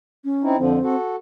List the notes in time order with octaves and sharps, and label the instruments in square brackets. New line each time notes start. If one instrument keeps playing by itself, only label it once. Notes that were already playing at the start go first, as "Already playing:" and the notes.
[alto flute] C#4
[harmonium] C4 D#4 E4
[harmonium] F2 D3 F3 [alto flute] C4
[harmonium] F#4 A4